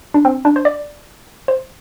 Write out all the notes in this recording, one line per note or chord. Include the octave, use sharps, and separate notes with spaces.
D4
C4
D4
C5
D5
C5